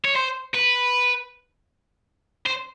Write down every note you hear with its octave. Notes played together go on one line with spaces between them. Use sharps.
C#5
C5
B4
C5